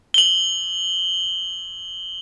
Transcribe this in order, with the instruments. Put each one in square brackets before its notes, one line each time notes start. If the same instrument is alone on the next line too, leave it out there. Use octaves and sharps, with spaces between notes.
[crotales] F#7 G7